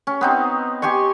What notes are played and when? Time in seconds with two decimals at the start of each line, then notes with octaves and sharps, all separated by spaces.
0.07 C#4
0.21 B3 C4 D#4
0.82 G4 G#5 C6 C#6